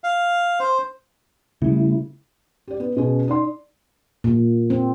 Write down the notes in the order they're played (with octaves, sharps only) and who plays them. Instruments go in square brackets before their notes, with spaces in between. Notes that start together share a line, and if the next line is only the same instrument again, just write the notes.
[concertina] F5
C5
[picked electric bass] C#3 G3 [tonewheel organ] A3 E4
[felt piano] G4 D5
B3
B2 C#4 G#4
D#4 D5 C6
[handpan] A#2
C4